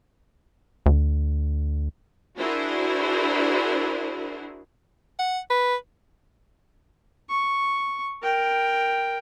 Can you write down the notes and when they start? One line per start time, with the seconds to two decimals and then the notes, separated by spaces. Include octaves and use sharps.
0.86 D2
2.38 D4 E4 F#4 G#4 A#4 C5
5.19 F#5
5.50 B4
7.29 C#6
8.23 A#4 G5